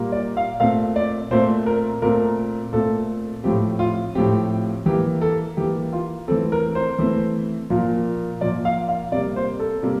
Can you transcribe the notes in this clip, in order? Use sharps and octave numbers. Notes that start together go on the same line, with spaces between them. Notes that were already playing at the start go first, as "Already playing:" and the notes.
Already playing: A#2 G3 A#3
D5
F5
A#2 A3 C4 F5
D5
A#2 A3 C4 C5
A#4
A#2 A3 C4 A#4
A#2 A3 C4 A4
A2 F3 C4 G4
F4
A2 F3 C4 G4
E3 A#3 G4
A4
E3 A#3 G4
F4
E3 A3 C4 A4
A#4
C5
E3 A3 C4
A#2 F3 A#3
A#2 F3 A#3 D5
F5
F5
C3 G3 A#3 D5
C5
A4
C3 G3 A#3